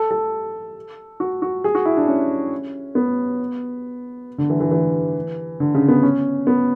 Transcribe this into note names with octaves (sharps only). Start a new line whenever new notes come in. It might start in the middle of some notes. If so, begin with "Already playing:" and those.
Already playing: A4
A4
F#4
F#4
G#4
F#4
E4
D4
C#4
B3
D3
E3
E3
E3
D3
C#3
B3
C#4
B3